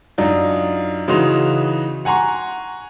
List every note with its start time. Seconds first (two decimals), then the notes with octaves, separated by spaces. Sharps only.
0.18 F#2 D4 D#4 F4
1.08 C#3 E3 D#4 F#4 C6 F7
2.05 F#5 G#5 A#5 C6 C#6